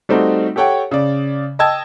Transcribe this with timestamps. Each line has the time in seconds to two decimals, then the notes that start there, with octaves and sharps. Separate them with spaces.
0.09 G3 A3 C4 D#4 F#4
0.56 G4 A4 C#5 F#5 G5
0.91 C#3 D5
1.59 D#5 G5 A5 E6 G#6